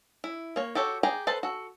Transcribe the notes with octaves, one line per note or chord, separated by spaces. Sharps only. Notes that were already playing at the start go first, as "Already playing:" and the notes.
E4
A#3 C#5
F#4 G4 A4 C#5
G4 G#4 G5 A#5
A4 B4 C5 A5 B5
F#4 A4